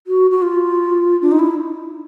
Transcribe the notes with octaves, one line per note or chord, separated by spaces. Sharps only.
F#4
F#4
F4
D4
D#4
E4